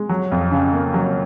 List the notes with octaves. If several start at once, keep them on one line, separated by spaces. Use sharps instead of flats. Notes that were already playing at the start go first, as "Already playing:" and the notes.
Already playing: G#3
F#3
F2
C#3
A#3
F#3